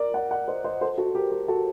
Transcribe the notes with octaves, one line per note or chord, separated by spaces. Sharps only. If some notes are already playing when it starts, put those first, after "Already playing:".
Already playing: A#4 D5
D5 F#5
D5 F#5
C5 D#5
C5 D#5
A4 C5
F#4 A4
G4 A#4
G4 A#4
F#4 A4